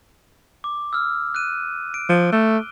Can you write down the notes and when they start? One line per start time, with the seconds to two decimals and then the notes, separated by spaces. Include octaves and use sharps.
0.64 D6
0.93 E6 F6
1.35 F#6 D#7
1.94 D7
2.09 F3
2.32 A3 G7